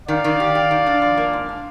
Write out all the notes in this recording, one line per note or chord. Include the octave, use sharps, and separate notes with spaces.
D#3 D5 F5
D#3
G4
G4
D#3
D4
F3
A#3
G#2
D4